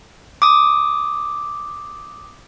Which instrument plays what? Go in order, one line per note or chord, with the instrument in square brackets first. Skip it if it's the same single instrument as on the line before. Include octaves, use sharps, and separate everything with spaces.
[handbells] D6 D#6